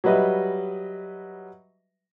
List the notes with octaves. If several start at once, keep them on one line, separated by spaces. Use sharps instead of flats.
F#3 G3 B4 D#5 E5